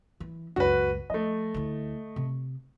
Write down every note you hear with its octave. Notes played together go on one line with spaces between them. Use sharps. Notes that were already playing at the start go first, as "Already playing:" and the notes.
E3
C#2 F#2 F#4 B4
F3 A3 D#5
D2 E4
C3